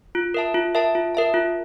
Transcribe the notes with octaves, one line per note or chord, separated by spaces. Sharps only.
F4
A#4 E5 A5
F4
A#4 E5 A5
F4
A#4 E5 A5
F4